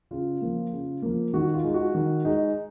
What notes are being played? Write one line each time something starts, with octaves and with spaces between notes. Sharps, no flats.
C#3 F4
F3 A#3
C#3
F3 A#3
D#3 F#4
F4
G#3 D#4
F#4
D#3
G#3 D#4